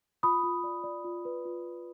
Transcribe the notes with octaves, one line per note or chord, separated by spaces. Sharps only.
F4 B5 D#6
F4
D5
D5
F4
B4
F4